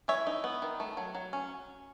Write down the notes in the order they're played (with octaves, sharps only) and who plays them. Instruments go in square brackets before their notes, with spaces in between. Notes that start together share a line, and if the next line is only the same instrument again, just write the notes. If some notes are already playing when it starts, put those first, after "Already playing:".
[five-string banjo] E3 C#5 E5
D#4
B3
D#3
A3
F#3
F#3
C#4